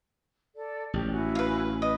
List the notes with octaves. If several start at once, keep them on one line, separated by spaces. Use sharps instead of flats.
A4 D5
A1 G4
E4 F#4 G#5
B4 F5
B4 D#5